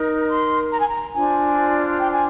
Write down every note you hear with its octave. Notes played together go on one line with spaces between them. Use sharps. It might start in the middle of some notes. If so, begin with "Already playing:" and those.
Already playing: D#4 A#4
C6
A#5
G#5
A#5
D4 F4 C5 G#5
G5
G#5